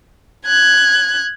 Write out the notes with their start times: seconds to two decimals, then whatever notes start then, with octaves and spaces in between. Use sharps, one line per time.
0.46 F#6 G#6